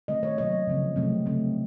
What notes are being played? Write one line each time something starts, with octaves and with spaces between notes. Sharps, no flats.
D#3 A3 C4 D#5
C#5
C3 F#3 A#3 D#5
C#3 F3 C4
C3 F#3 A3 C4
C#3 A3 C4